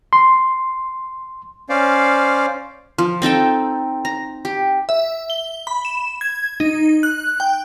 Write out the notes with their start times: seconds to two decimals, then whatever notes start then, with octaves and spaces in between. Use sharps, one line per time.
0.13 C6
1.69 C#4 C5 D5 F5
2.98 F3
3.22 C4 D#4 A4 G5
4.05 A#5
4.45 G4
4.89 E5
5.30 G7
5.67 B5
5.85 E7
6.21 G#6
6.60 D#4
7.03 F#6
7.40 G5